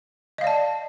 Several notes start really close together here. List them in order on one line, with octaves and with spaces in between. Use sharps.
D#5 F5 D5 A5